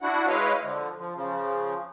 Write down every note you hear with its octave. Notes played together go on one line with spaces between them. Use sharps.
D4 E4 F#4 F#5
G#3 E4 B4 C#5 D#5 F5
D3 F3
F3
C#3 F3